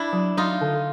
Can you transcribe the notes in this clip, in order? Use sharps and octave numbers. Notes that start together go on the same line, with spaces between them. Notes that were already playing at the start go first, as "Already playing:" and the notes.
Already playing: D4 E4
F#3
F#3 D#4 F4
D3